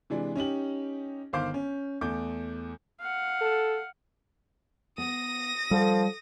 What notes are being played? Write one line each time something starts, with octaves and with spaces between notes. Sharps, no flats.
C3 E3 G#3 D4
C#4 D#4 G4 F#7
G1 D#3 C5 F5 D6 G6
C#4
E2 A3 D6 G6
F5 F#5
A4
B3 D#6 A#6
F3 G3 A4 F#5